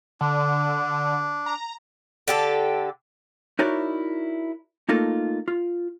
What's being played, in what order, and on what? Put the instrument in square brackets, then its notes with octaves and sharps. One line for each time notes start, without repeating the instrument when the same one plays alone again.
[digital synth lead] D3 [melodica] D4
[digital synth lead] A#5
[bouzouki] D3 G4 A4
[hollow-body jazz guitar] D#4 E4 F#4 A#4 C#5 D5
A3 A#3 D#4 F4 A4 A#4
F4